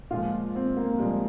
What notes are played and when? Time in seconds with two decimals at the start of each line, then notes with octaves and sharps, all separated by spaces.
0.11 A#2 F3 G#3 F4
0.55 C4
0.76 A#3
0.99 A#2 F3 G3 G#3